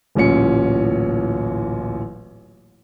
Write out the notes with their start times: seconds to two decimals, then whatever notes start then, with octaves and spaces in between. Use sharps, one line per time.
0.15 D1 A1 A#2 C#4 C#7